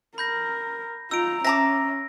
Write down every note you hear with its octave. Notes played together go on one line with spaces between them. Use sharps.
A#4 B5 G6 A#6
D#4 F4 A#5 E6 D7
C#4 E5 A#5 D6 A#6